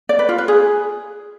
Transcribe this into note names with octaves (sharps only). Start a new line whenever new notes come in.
D5
B4
F4
B4
G#4